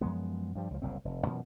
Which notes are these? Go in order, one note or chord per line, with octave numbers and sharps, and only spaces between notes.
F#2 F3 G#3 B3
G2 F3 G3
C#2 F3
F#1 C2 A#2 C4
F1
F#2 B2 E3 F3